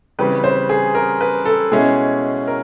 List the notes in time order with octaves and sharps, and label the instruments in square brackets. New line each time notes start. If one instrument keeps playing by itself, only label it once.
[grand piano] C#3 E3 G3 C4 B4
C5
G#4
A#4
B4
A4
B2 G#3 C#4 E4 G#4
A#4